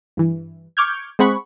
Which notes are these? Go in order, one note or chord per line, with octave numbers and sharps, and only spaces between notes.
G2 E3
C#6 D6 F6 G6 G#6
G#3 C4 G#4 F#5 B5 C#6